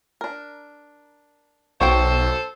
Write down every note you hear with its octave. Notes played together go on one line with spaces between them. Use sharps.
D4 A#4
B1 F#4 A4 C5 C#5 G5 C#6